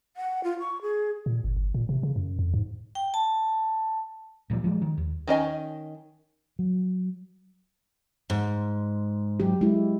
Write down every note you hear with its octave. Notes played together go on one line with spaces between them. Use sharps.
F#5
F4
C#6
G#4
A#2
G1
G1
A#2
C3
C#3
F#2
F2
G#2
G5
A5
D2 A#2 F3 G3
F3 G3 G#3
D#3
D#2
D#3 C#4 D#5 G#5
F#3
G#2
F#3 G4
G#3 E4